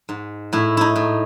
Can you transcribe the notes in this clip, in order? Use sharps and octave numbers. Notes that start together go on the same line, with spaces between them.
G#2
A2 E4
D#4 E4
A2